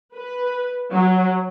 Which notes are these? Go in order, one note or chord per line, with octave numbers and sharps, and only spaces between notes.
B4
F#3